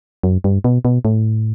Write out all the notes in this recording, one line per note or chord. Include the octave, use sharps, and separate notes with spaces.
F#2
G2
B2
B2
A2